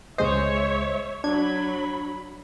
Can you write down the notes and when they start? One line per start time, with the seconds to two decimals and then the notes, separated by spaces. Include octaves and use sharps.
0.18 C#2 G#3 C5 C#5 D#5 E5
1.24 F#3 D4 B5 G#6